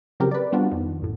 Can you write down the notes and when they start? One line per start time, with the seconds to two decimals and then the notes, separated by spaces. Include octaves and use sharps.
0.20 C#3 F3 F#3 C4 G4 A#4
0.31 B4 D5
0.52 G3 B3 C4 D4 F4 F#4
0.71 F2 D#3
1.00 A#1 F#2 A2